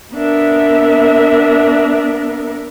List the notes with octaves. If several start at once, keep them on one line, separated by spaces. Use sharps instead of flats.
B3 D4 A#4 E5